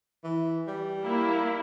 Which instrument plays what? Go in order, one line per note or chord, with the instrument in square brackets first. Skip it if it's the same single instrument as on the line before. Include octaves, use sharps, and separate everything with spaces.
[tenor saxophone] E3
G3
[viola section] A#3 E4